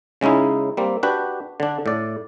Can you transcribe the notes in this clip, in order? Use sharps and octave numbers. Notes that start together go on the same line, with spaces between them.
C#3 G#3 C#4 D#4 E4
G3 A#3 C4
D4 F#4 G4 B4
D3 D4
A2 D5